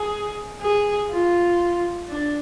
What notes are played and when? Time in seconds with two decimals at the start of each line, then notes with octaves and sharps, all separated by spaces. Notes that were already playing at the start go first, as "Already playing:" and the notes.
Already playing: G#4
0.61 G#4
1.10 F4
2.08 D4